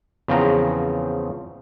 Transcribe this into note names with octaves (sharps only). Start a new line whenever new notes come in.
E2 C#3 F3 C4 A#5